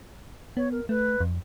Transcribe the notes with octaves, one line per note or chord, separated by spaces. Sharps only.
B3 C#5
A#4
A3 B4
F2